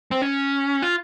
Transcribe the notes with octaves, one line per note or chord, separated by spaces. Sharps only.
C4
C#4
F4